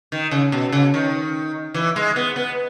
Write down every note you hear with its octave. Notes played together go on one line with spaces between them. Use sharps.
D#3
C#3
B2
C#3
D#3
E3
G#3
B3
B3